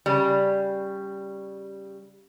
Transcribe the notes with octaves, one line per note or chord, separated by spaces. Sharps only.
C#3 G3